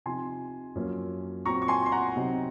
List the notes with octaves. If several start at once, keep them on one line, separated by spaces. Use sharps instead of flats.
C3 F3 C4 D#4 G#5 C6
F#2 F3 A#3 C#4
A#2 F#3 C4 A#5 C#6
C#6
G#5 C6
C6
F#5 A#5
C3 F#3 C4 D#4